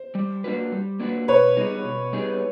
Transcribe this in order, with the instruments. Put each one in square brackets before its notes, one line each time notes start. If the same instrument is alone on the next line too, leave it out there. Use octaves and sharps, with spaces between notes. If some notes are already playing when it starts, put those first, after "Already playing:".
Already playing: [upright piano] C5
[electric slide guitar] G3
A#3 D4 F#4 B4
G3
A#3 D4 F#4 B4
[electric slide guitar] B2 [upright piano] B4 C#5
[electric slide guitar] G3 B3 D#4 G#4
B2
G3 B3 D#4 G#4